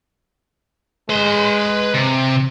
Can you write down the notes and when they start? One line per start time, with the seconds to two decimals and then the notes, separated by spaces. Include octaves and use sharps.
1.10 G#3 B4 C6
1.94 C3